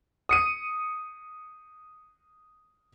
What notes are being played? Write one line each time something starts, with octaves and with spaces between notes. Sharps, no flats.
D#6 C#7 D#7